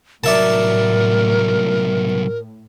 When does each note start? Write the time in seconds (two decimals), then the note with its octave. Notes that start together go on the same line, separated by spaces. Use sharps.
0.24 C2 A2 F#3 A#4 D5 E5 A5